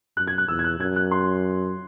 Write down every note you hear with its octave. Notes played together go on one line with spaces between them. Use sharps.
F#2 F#6
G#6
F#6
E2 E6
G#6
F#6
F#2 G#6
F#6
C6